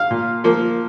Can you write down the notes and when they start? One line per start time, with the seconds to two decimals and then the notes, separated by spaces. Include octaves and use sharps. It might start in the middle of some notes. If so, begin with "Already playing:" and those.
Already playing: F5
0.11 A#2
0.44 F3 A#3